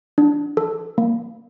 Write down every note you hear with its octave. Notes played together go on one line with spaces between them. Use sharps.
D4
A4
A#3